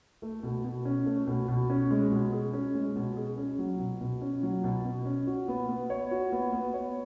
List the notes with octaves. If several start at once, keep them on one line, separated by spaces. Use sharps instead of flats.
A3
B2
B2
C#4
A3
B2
B2
C#4
G#3
B2
G#4
C#4
G#3
B2
G#4
C#4
F#3
B2
B2
C#4
F#3
B2
B2
C#4
F#4
B3
B3
C#5
F#4
B3
B3
C#5